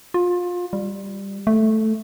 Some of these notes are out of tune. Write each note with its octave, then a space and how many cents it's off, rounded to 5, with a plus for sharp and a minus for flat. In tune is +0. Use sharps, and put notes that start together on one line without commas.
F4 +25
G3 +10
A3 -5